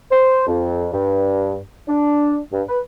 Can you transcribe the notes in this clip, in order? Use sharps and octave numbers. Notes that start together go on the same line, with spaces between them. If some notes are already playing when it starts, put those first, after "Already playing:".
C5
F2
G2
D4
G2
B4